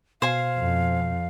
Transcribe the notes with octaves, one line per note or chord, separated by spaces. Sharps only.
B2 C5 F5 G#5
F2